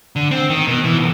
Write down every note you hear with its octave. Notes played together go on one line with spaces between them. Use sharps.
D3
C4
D#3
B2
E3
B1